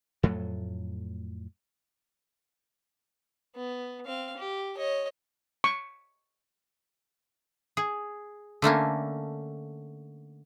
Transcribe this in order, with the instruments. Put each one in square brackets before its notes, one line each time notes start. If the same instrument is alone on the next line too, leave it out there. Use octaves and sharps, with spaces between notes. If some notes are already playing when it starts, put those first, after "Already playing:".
[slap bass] F2 A2 F#3 A3
[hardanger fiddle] B3
C4 F5
G4
C#5 D#5
[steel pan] C#6
[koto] G#4
D3 A3 A#3 C#4